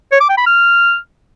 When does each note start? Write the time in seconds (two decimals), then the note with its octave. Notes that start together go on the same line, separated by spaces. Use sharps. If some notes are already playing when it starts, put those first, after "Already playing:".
0.12 C#5
0.20 D6
0.29 G5
0.38 B5
0.46 F6